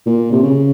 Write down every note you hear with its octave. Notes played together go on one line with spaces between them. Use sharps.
A#2
C3
C#3